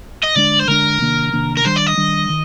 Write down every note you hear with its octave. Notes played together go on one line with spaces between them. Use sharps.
D#5
D3 G#3 D4 D5
C5
D3 G#3 D4 A#4
C3 D#3 A#3 D4
C3 D#3 A#3 D4
A#4
D#3 G3 D4 C5
D5
D#5
D#3 G3 D4
D#3